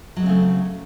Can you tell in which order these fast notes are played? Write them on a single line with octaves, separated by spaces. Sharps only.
F#3 G#3 C4 C#3 A3